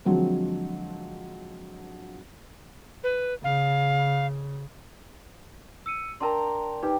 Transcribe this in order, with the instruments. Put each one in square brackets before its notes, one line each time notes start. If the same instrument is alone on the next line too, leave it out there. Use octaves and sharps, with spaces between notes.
[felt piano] D3 F3 F#3 G#3 C4
[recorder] B4
[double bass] C#3 [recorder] F5
[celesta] E6 C#7 D#7
[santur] D4 G5 A#5 [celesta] A#4 A5 C6
[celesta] D#4 B4 [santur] G4